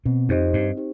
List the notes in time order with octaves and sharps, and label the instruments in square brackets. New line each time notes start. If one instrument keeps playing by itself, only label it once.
[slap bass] B2 [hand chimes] C4
[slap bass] F2 [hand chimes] D#4 G4 C5 D#5
[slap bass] G2 [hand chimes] C4
[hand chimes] D#4 G4 C5